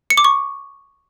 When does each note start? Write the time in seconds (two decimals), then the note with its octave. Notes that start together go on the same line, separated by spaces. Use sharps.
0.10 C#7
0.17 D6
0.24 C#6